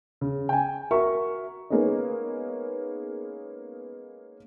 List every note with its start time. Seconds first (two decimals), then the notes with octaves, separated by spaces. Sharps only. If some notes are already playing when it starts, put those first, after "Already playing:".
0.21 C#3
0.49 G5 G#5
0.91 F#4 A#4 E5 C#6
1.70 G#3 A#3 B3 C#4 D#4